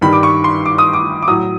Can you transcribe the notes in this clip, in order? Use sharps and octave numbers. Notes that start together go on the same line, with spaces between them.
G2 D#3 G3 B5
D6
C#6
C6
D6
D#6
D6
D6
A2 F#3 D#6